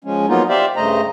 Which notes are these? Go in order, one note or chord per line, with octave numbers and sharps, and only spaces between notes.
F3 G#3 C#4
F3 F#3 A#3 B3 D#4 F4
G4 C5 D5 E5 F5
G2 C#3 A3 C5 D#5 A#5